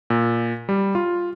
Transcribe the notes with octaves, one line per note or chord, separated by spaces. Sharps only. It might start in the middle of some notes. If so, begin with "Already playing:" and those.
A#2
G3
F4